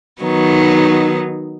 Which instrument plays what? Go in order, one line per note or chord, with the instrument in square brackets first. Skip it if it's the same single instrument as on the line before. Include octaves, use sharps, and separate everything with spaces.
[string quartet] D#3 F#3 B3 D#4